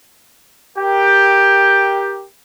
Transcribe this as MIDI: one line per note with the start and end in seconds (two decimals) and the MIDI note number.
0.77 2.24 67
0.77 2.24 70
0.77 2.24 79